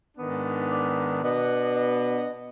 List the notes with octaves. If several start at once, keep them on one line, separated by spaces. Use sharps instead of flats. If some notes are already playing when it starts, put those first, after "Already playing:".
G#2 D#3 B3 D4
D5
B2 B3 D4 D#5
D#5